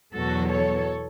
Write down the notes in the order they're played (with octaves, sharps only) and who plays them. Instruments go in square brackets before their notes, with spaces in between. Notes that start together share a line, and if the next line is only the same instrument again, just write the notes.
[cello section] E2 B2 F#3 F#4 A4
A4 C#5